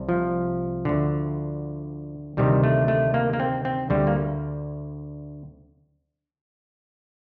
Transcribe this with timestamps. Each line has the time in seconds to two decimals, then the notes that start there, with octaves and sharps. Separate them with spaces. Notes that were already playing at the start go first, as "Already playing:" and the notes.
Already playing: C2 C3
0.09 F3
0.85 D2 D3
2.37 D2 C3 D#3 G3
2.64 A3
2.88 A3
3.14 A#3
3.33 A#3
3.40 C4
3.65 C4
3.90 D2 D3 G3
4.07 A#3